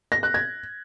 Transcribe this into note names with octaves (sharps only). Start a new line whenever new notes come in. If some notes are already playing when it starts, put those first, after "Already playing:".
A#6
F#6
G#6